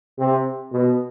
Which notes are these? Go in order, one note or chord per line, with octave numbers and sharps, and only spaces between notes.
C3
B2